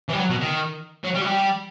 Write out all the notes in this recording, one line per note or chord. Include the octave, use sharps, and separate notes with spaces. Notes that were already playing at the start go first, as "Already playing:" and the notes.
E3
G3
F#3
B2
D#3
F#3
G3
F#3
G3